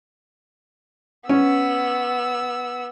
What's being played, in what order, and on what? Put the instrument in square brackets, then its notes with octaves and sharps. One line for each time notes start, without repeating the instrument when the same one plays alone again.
[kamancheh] B3 E6 [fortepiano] C#4